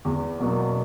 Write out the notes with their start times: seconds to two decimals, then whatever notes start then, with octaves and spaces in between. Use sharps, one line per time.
0.05 E2
0.40 B2 F#3 A#3